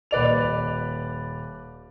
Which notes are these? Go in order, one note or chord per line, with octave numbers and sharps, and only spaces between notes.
D#1 B4 D5 F7